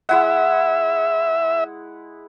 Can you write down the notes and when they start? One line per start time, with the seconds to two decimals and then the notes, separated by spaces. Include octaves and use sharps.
0.09 G#3 E4 E5 F#5